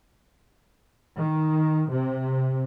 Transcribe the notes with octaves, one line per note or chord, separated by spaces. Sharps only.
D#3
C3